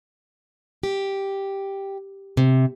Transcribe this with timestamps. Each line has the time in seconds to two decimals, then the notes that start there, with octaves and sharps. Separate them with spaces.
0.83 G4
2.37 C3